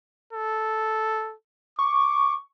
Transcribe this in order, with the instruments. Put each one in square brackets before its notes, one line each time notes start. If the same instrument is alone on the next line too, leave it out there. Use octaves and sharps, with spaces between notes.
[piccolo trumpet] A4
[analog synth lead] C#6 [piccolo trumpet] D6